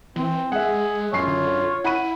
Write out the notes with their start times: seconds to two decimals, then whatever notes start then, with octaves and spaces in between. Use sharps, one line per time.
0.16 E3 C4
0.52 G#3 G#4 E5 F#5
1.13 F#2 G#3 F4 C#5 C7
1.27 D3
1.84 E4 F#5 B5 D#7